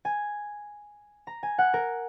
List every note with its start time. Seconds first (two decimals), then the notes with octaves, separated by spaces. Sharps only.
0.05 G#5
1.27 A#5
1.43 G#5
1.58 F#5
1.74 A#4